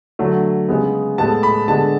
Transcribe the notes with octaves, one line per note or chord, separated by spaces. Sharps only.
D3 F#3 A3
C#3 G#3 B3
A2 G#3 B3 A5
B5
D3 G#3 B3 A5